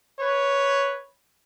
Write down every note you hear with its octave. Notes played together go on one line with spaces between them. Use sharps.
B4 C#5